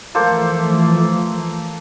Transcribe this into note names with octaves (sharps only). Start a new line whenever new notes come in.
E3 F3 A3 A#3 A4 C5